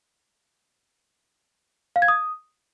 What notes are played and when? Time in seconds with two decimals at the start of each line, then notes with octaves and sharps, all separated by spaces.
1.96 F5
2.02 G#6
2.08 D#6